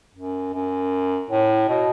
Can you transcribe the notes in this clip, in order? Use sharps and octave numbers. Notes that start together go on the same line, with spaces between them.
F#2
F#2
A2
B2